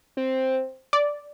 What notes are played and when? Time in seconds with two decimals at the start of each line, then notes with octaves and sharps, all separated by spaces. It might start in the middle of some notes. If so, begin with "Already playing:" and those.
0.17 C4
0.93 D5